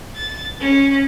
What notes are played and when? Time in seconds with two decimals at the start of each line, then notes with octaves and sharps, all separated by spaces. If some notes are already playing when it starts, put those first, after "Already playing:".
0.16 A6
0.61 C#4